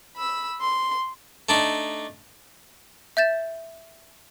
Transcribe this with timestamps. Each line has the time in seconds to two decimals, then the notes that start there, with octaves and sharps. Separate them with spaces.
0.16 B5 E6
0.61 C6
1.49 A3 D4 D#4
3.17 E5 G6 A6 E7